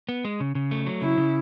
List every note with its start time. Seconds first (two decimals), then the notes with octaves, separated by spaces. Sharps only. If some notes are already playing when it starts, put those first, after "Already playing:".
0.09 B3
0.25 G#3
0.40 C#3
0.55 C#3
0.71 A3
0.86 F#3
1.01 C#3 E4
1.18 C#3